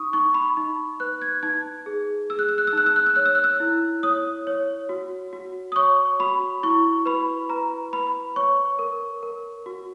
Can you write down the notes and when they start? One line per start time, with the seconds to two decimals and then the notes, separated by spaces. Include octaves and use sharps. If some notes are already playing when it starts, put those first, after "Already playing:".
Already playing: D#4 C#6 D#6
0.13 D#4 C#6
0.34 B5
0.57 D#4
1.00 B4 F#6
1.22 G#6
1.43 D#4 G#6
1.86 G#4
2.30 G#4 E6
2.39 F#6
2.49 E6
2.58 F#6
2.67 E6
2.73 D#4 F#6
2.86 E6
2.96 F#6
3.06 E6
3.16 C#5 F#6
3.26 E6
3.35 F#6
3.44 E6
3.60 E4
4.03 C#5 D#6
4.47 C#5
4.89 F#4
5.33 F#4
5.72 D#6
5.76 C#5 C#6
6.20 F#4 B5
6.63 E4 C#6
7.06 B4 B5
7.49 B4 A#5
7.93 B4 B5
8.36 C#5 C#6
8.79 A#4
9.23 A#4
9.66 F#4